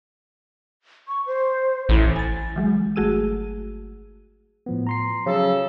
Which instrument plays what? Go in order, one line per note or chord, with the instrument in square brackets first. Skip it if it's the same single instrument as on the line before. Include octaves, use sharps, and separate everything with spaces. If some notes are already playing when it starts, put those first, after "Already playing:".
[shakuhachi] C#6
C5
[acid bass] A1 [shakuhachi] E4
[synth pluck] G#5 A6
E3 F#3 G#3
G1 A3 F#4 G#4 E6 D#7
[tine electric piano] A2 F3 B3
A#5 C6 C7
[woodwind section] C#3 A4 [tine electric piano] F3 F#3 C#4